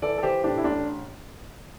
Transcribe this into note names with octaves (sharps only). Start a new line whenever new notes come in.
E3 A4 D5
A4
E3 G4 C5
A2 D4 G4
E4
A1 D4